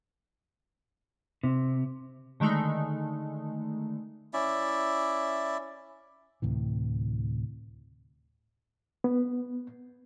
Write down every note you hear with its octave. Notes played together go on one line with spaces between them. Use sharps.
C3
D3 D#3 G#3 A3 D#4
C#4 E4 D5 E5
D2 A2 C3 E3
B3